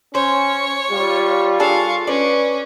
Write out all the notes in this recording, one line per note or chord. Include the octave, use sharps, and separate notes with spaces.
C#4 C5 C#5
G3 F4
D4 G#4 A4 F5 C#6
C#4 B4 D5